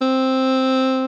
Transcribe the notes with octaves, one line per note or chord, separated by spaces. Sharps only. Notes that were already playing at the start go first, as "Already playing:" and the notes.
C4